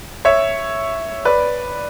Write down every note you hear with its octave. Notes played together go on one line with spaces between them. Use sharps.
C#5 E5
B4 D5